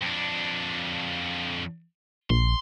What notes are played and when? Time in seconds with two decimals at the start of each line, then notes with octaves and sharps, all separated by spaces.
0.01 F2 D4
2.30 A#1 C6